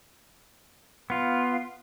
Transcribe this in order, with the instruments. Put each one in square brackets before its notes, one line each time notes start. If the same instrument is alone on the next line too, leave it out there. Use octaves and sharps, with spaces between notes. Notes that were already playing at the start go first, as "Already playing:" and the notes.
[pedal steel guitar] B3 F4